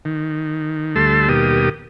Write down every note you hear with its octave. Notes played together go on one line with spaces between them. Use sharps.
D#3
D2 G3 A3 A5 C6 E6
D#2 B2 G3 A#3 G4 D#6